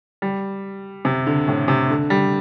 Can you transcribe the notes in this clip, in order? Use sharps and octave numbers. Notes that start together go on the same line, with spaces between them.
G3
C3
D3
A2
C3
D3
G3